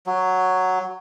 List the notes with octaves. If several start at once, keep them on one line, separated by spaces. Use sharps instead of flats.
F#3